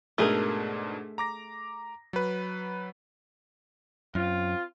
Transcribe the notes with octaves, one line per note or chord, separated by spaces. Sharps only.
G#2 B2 A3 D4 G#4 A#4
A#5 D6 A#6
F#3 B4
F#2 C4 F4